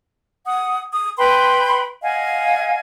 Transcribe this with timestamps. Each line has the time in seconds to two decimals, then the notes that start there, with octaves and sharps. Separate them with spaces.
0.46 F#5 D#6
0.91 D#6
1.17 B4 G5 B5 C6
2.01 D#5 F5 F#5 G#5